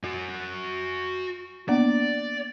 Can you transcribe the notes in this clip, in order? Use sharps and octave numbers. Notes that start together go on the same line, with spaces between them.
F#4 G#5
A#3 B3 D4 D5